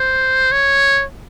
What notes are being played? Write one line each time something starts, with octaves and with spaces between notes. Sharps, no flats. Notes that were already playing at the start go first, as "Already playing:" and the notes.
Already playing: C5
C#5